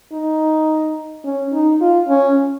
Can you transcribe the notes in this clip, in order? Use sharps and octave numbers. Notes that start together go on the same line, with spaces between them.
D#4
C#4
D#4
F4
C#4